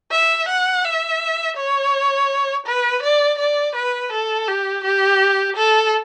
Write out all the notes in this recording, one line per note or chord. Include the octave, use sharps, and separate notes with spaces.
E5
F#5
E5
C#5
B4
D5
D5
B4
A4
G4
G4
A4